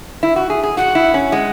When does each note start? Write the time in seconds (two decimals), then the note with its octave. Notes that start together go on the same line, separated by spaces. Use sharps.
0.23 E4
0.36 F#4
0.50 G#4
0.63 G#4
0.77 F#4 F#5
0.95 E4
1.14 C#4
1.32 G#3 F#5